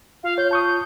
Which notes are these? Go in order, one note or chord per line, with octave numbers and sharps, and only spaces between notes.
F4 F5
C#5 G6
A5 C#6 D#6 G6